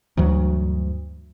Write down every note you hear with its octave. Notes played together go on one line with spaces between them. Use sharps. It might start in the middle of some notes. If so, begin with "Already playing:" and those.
D2 G2 E3 F#3